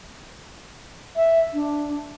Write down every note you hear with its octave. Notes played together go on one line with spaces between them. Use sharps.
E5
D4